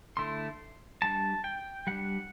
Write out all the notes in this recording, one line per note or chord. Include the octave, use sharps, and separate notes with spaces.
D3 A3 E4 C6
G3 D4 A5
G5
G3 D4 F#5